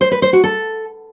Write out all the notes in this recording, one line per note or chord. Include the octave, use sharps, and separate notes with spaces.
C5
B4
C5
F#4
A4